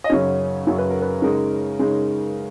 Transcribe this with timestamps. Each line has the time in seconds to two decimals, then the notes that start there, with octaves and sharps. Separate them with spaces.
0.04 D#5
0.10 F#2 C#3 F#3 C#4 C#5
0.66 F#2 C#3 F#3 C#4 C#5
0.78 B4
0.90 A#4
1.02 B4
1.22 C#3 G#3 D#4 A#4
1.79 C#3 G#3 D#4